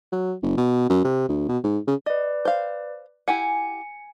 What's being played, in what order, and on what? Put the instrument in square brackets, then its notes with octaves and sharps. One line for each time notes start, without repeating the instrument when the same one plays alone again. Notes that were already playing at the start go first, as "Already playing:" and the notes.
[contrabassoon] F#3
F#1
B2
F#2
C3
D2
B2
G#2
C#3
[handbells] B4 D5 [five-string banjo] D#5
[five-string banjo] C5 F5
[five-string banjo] E4 G4 F#5 [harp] G#5 [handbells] C#7